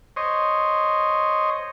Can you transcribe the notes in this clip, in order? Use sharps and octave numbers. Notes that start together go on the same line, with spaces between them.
C5 C#5 D#5